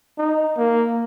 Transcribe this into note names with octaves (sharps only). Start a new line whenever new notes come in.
D#4
A#3